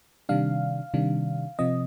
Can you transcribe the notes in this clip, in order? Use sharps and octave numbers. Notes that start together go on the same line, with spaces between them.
C3 D#3 G3 D4 F5
C3 D#3 G3 D4
C3 F3 C4 D#5